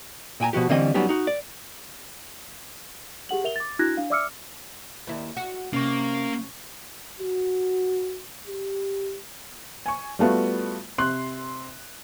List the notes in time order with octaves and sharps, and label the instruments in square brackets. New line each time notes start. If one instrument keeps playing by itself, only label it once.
[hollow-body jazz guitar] A#2 G5 G#5 A#5
B2 F3 F#4 G4
D3 E3 G3 C4 C#4 D#5
F#3 G3 B3 C#4 D#4 G4
D#4 F#4
D5
[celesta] G4 G#4 F#5 F#7
A#4 E5 F7 G7
D6 A6
D4 E4 F#4 F#6 G#6 A#6
D4 F5
D5 E5 D6 E6 F6 C#7
[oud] D#2 E4
F#4
[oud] C3 [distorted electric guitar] A#3 [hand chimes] C#4 C#6
[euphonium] F#4
G4
[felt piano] G#5 C#6
G3 A3 B3 F4 F#4
C3 C6 F#6